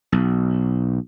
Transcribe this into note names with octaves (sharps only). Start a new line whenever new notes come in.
B1